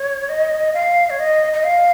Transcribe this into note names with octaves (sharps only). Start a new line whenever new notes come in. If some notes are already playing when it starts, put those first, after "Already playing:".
Already playing: C#5
D#5
F5
C#5
D#5
D#5
F5